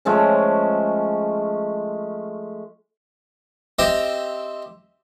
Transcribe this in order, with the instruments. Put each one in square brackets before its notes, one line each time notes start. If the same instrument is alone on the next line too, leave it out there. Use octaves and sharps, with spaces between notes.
[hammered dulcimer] F3 G#3 A3 C#4
[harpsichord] C4 G4 D#5 E5